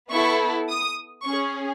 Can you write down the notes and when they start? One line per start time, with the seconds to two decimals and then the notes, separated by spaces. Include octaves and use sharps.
0.10 B3 E4 A4 C#6
0.68 D#6
1.25 C#4 G#4 C#6